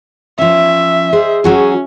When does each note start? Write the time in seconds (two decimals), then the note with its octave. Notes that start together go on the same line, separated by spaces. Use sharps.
0.38 F3 C#4 E5
1.13 G#4 C5 D#5
1.44 F#3 C#4 F#4 G#4